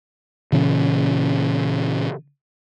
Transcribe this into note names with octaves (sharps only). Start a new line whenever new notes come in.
A#2 C#3 E3 C#4